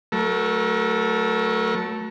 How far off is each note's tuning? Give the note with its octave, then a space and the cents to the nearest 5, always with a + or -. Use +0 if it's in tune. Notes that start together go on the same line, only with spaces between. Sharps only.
F#3 +0 A3 +0 A#4 +30